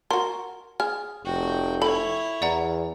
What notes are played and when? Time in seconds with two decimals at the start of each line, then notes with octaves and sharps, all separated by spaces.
0.11 F#4 A#4 C6
0.80 G#4 F6
1.25 F1 F#4 G5
1.82 E4 A4 C#5 B5
2.42 E2 D5 F#5 A#5